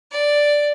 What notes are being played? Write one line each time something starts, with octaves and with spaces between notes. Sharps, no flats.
D5